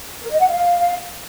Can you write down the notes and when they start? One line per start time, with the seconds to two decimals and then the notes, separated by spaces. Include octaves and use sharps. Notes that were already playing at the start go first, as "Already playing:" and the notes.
0.22 A#4
0.31 D#5
0.40 F#5
0.50 F5